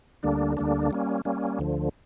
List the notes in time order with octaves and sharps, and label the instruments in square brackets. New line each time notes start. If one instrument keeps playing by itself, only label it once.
[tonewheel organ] D2 D3 G3 A#3 D4
D2 D3 G3 A#3 D4
G3 A#3 C#4
G3 A#3 C#4
D2 D3 F3